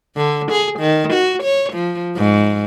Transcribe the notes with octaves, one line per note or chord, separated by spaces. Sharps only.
D3
G#4
D#3
F#4
C#5
F3
G#2